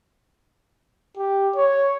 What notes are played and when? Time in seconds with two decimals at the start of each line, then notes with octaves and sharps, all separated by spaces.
1.17 G4
1.56 C#5